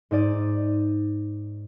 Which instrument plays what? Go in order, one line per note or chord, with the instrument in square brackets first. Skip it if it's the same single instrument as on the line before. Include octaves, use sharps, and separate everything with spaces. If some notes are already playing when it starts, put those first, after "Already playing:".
[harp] G#2 D#4 D5 D#7